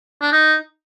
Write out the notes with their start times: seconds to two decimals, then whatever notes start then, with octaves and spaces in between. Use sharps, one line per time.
0.21 D4
0.33 D#4